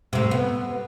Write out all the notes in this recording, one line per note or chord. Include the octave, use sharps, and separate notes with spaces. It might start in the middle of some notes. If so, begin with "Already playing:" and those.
A2 C3
B3